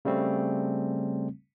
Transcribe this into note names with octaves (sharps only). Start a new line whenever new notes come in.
C#3 G3 A3 C4